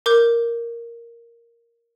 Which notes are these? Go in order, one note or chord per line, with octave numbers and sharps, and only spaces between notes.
A#4 D6 G6